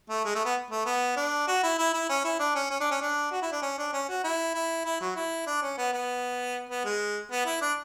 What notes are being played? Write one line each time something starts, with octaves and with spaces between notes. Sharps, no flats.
A3
G#3
A3
B3
A3
B3
D4
F#4
E4
E4
E4
C#4
E4
D4
C#4
C#4
D4
C#4
D4
F#4
E4
D4
C#4
D4
C#4
F#4
E4
E4
E4
F#3
E4
D4
C#4
B3
B3
B3
G#3
B3
E4
D4